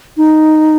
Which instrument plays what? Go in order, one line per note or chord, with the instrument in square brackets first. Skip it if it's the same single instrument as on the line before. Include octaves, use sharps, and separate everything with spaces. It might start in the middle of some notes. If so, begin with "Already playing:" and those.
[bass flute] D#4